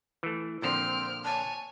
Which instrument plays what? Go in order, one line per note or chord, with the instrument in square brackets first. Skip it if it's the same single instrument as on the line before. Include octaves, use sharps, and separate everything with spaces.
[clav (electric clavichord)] E3 A3
[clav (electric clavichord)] A#2 D3 F3 [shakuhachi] C4 [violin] F6 D7
[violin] C#5 G#5 [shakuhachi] A5